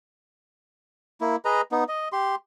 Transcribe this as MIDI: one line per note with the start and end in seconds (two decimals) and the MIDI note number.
1.21 1.36 58
1.21 1.36 64
1.45 1.61 68
1.45 1.61 71
1.45 1.61 75
1.45 1.61 82
1.72 1.84 59
1.72 1.84 63
1.88 2.08 75
2.12 2.35 67
2.12 2.35 84